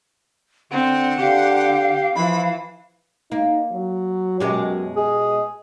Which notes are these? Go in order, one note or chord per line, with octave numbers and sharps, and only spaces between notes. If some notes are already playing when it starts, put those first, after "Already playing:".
D3 C4 F#5
D3 G4 F5
E3 F3 B5
A#3 D#4
F#3
F#2 B2 G#3 G4
G#4 D#5